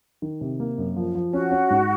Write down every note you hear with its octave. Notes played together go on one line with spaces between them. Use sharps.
D#3
C3
A#3
F#2
F3
F3
C#4 F#4
C#4
G#2